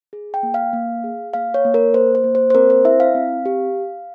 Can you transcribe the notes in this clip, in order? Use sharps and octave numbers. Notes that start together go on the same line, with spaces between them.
G#4
G5
A#3
F5
A#3
G#4
A#3 F5
C#5
A#3
A#4
A#3 C5
C5
A#3
C5
C5
C4 A#4
C5
E4 E5
F5
C4
G4